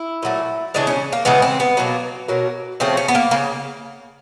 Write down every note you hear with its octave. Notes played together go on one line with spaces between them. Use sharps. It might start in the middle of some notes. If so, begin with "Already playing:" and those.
Already playing: E4
A#2 F#3 A3
C#3 E3 G#3 D4
C#4
A#3
C#3 E3 G#3 B3
C4
B3
B2 F#3 A#3
B2 F#3 A#3
C#3 F3 A3 C4
C#4
B3
A#3
C#3 A#3